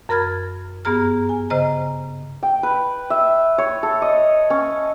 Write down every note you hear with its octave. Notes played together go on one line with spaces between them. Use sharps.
F#2 A#4 B5 F6 G#6 A6
G2 B3 G#4 A#5 F6
G#5
C#3 C5 D#5 A#5
G5
B4
E5
C#5
A4
D#5
C#4